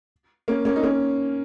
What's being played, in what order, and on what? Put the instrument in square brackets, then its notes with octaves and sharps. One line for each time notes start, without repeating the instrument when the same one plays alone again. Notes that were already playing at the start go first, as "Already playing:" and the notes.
[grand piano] A#3 C#4
A#3 C#4
D#4
A#3 C#4